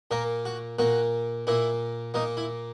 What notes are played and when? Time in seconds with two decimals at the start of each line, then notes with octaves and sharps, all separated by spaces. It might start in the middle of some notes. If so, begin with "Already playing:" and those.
0.11 A#2 A#3 A#4
0.45 F#4
0.79 A#2 A#3 F#4
1.47 A#2 A#3 E4
2.14 A#2 A#3 D#4
2.37 E4